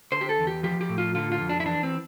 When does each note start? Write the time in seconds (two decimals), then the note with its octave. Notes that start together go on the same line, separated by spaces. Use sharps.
0.12 D3 C5
0.21 G4
0.29 A4
0.38 E2
0.47 G4
0.63 F3 G4
0.81 G4
0.89 A2
0.98 F4
1.15 D3 F4
1.32 F4
1.40 F2
1.49 D4
1.60 E4
1.66 E3 D4
1.83 C4